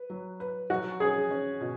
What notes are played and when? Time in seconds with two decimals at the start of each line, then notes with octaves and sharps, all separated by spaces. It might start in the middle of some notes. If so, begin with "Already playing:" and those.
Already playing: B4
0.10 F#3
0.40 B4
0.70 F#3 F#4
1.00 C#4 G#4
1.30 C#4
1.61 B2